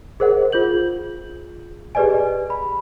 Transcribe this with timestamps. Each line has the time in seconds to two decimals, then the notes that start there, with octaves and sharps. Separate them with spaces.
0.20 G#4 A#4 C5 D#5 F#5
0.52 F4 G#4 G6 F#7
1.95 G4 G#4 B4 D5 D#5 G#5
2.50 B5